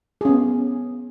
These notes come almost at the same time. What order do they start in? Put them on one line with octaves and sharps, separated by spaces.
G#4 C#4 B3